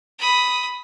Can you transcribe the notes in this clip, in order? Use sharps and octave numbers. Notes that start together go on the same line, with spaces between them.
B5 D#6